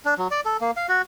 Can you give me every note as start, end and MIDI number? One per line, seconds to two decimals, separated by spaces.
0.05 0.14 62
0.18 0.28 54
0.31 0.40 74
0.46 0.57 69
0.61 0.71 58
0.77 0.87 77
0.89 1.02 66